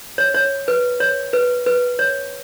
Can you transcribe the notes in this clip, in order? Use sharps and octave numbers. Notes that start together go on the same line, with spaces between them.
C#5
C#5
B4
C#5
B4
B4
C#5